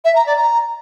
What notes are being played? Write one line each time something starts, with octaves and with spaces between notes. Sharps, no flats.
E5
A#5
D5
A#5